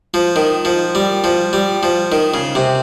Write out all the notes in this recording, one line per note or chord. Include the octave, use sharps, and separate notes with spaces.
F3
D#3
F3
G3
F3
G3
F3
D#3
C#3
C3